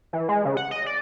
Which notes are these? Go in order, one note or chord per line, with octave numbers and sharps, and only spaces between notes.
E3
G#3
C#3
F#5
D#5
D5